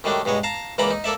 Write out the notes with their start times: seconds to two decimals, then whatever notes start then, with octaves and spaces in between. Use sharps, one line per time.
0.04 F#2 D#3 G3 A3 D4
0.25 G2 B2 G#3 C#5
0.43 F5 A5 A#5
0.78 C#2 E3 A#3 D5 A#5 B5
0.91 D#4
1.04 A#3 A4 D5 E5